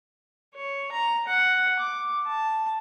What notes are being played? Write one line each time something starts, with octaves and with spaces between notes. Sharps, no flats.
C#5
A#5
F#5
D6
A5